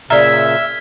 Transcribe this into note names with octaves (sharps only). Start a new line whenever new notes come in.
A#2 C#3 D5 E5 A#5 F6 G#6 B6